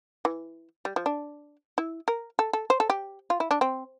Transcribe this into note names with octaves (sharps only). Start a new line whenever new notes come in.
E3
G3
F3
D4
E4
A#4
A4
A4
C5
A4
G4
F4
E4
D4
C4